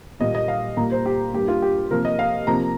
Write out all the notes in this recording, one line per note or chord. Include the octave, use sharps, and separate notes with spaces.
A#2 G3 A#3 D#5
D#5
F5
A#2 G3 A#3 A#5
C5
G4
G2 G3 A#3 G4
F4
G4
C3 F3 A#3 A#4
D#5
F5
C3 F3 A#3 A#5